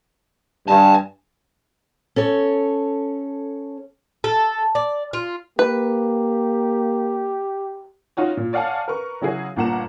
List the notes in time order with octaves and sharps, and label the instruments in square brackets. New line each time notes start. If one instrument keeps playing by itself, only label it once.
[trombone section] G2 [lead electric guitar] G#5 A5
[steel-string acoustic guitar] C#4 A4 C#5
[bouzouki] A4
D5
F4
[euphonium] A#3 [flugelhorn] G4 [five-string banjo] B4
[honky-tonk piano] C#4 D#4 F4 F#4 C#5
A#2
C#5 D5 F5 F#5 G#5 A5
A#4 B4 C#6
C#3 F#3 E4 F#4 G#4
G1 A#2 A#3 F#5 A#5 E7